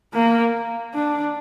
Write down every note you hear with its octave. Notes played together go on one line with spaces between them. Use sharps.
A#3
D4